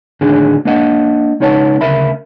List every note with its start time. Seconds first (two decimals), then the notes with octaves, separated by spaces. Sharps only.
0.21 A2 D3 D#3 D4 F#4 G#4
0.65 A#3 D4 D#5 F#5
1.40 C#2 C#4 D#4 C#5 F#5 A5
1.81 D2 C#3 A#4 E5 B5